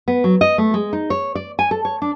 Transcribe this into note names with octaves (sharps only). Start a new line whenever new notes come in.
B3
F#3
D#5
A3
G#3
D#4
C#5
D5
G#5
A4
C#5
D4